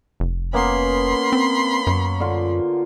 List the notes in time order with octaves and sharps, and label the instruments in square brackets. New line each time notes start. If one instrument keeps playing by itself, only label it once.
[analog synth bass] F1
[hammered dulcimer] A#3 B3 C#4 [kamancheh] B5 C6
[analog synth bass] C4
[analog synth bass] F#2 [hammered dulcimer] C#5
[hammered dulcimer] D3 F4